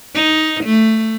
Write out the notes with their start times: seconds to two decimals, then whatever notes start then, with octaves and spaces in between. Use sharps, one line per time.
0.15 D#4
0.64 A3